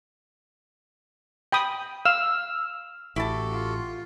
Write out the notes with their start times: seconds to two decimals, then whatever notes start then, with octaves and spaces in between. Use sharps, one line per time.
1.52 G5 B5 D#6
2.05 F5 E6 F6
3.16 A1 E4 F#4 G4 A4 A5
3.53 F4